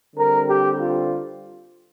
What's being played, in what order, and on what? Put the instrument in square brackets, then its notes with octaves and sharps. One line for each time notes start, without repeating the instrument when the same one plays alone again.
[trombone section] D3 G3 C4 A#4
G4
F4